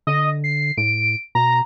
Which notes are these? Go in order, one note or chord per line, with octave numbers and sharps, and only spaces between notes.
D3 D#5
C7
A2 D7
B2 A#5